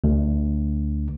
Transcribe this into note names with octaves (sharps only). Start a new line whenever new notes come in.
D2